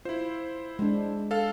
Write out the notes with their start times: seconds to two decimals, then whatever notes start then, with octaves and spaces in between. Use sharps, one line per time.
0.05 E4 F4 C5
0.79 G#3 D4
1.31 A4 F5